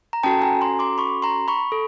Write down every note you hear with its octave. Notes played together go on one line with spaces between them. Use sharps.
A#5
C#4 F#4 A4 G5 A5
G#5 A#5
A#5 C6
C6 D6
B5 C#6
A#5 C6
B5 C#6
A4